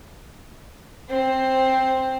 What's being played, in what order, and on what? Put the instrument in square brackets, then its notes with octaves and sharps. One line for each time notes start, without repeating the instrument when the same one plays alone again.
[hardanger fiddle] C4 C5